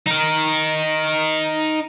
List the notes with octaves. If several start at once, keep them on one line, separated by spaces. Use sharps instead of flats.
D#4 A#4